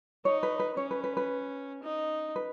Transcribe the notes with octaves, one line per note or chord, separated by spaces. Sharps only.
D#4 C#5
B4
B4
C#4 C#5
B4
B4
B4
D#4
B4